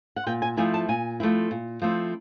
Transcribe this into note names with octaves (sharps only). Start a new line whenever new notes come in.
F#5
A#2 G5
G#5
F3 A3 C4 E4 G#5
A5
A#2 G#5
F3 A3 C4 E4
A#2
F3 A3 C4 E4